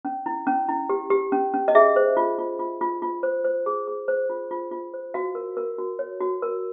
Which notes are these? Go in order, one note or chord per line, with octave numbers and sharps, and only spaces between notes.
C#4
E4
C#4
E4
G4
G4
C#4
C#4
D#5
G#4 E5
C5
F4
F4
F4
F4
F4
C5
C5
G#4
G#4
C5
F4
F4
F4
C5
F#4 F5
A#4
A#4
F#4
C#5
F#4
A#4